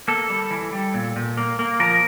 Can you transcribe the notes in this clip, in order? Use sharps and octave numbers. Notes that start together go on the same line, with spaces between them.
A#3 A4
G3
E3
G3
A#2
A#2
A#3
A#3
F3 A#4